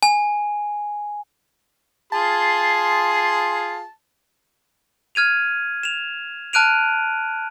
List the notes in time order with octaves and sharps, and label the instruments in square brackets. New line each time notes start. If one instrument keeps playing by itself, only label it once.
[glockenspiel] G#5
[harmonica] F4 G#4 C6 [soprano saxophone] A5
[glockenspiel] F6 G#6 D#7 F7
E7 F7
A5 F6 F#6 D7 D#7 F7